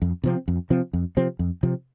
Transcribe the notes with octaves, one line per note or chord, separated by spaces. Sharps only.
F2
C3 F3 C4
F2
C3 F3 C4
F2
C3 F3 C4
F2
C3 F3 C4